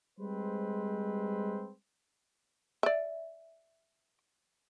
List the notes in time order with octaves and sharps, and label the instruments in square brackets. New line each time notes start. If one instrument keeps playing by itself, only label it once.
[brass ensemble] G3 G#3 C4 B4 C5
[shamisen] D5 E5